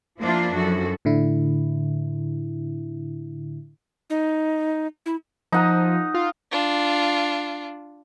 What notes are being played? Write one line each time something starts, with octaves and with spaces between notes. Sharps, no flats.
F3 A#3 D4 E4 F4 C5
F#2 F3 F#4 A4
A2 D3 E4
D#4
E4
F3 D#4 F#5 A#5
F4
D4 F4